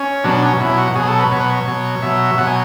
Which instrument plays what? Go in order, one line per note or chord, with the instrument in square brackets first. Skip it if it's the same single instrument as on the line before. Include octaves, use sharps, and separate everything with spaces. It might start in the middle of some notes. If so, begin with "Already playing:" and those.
Already playing: [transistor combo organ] C#4
B2 F#3 D4
C#4
B2 F#3 E4
F#4
F#4
B2 F#3 G#4
A4
B4
B2 F#3 C#5
B4
C#5
B2 F#3
B2 F#3 E5
B2 F#3 F#5
G#5